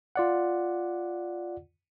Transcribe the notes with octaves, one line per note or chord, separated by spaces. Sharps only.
F4 D5 F#5